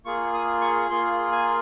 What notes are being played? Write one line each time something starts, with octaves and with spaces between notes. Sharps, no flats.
A#3 F4 G#4 C#6
D#6
C#6
A#3 F4 G#4 C6
G#5